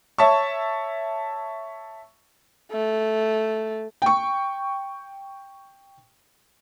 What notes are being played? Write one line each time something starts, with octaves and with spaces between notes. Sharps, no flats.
C#5 E5 A5 C#6
A3
G5 C#6